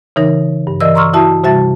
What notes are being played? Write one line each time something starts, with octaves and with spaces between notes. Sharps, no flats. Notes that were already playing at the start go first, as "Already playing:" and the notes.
C#3 E3 D#4 A#4
G2
E3 A#4 D5 D#5 E6
A#5 C6 C#6 E6 F6
E4 F#4 E5 A5 D#6
C3 G3 F#4 E5 A5 A6